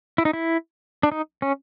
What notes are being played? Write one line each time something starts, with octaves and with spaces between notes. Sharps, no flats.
E4
D#4
E4
D4
D#4
C#4